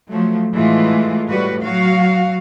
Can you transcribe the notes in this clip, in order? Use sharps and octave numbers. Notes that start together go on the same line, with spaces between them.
F3 F#3 A3
A2 E3 G#3 A3 F4
A2 G3 F#4 B4
F#3 F#4 F5